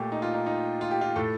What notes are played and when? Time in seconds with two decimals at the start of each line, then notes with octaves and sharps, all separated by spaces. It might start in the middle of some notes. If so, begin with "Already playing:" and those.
Already playing: A#2 A3 G4
0.12 D#4
0.22 F4
0.34 D#4
0.46 D#4
0.81 F4
0.91 G4
1.01 F4
1.16 A2 A3 A4